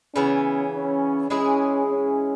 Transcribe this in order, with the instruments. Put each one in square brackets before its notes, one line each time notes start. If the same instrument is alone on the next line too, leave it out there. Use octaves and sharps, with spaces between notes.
[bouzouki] C#3 E3 B3 [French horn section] C#4
[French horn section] C#4
[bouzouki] E3 G#3 E4 G#4 [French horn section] C#4
[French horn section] C#4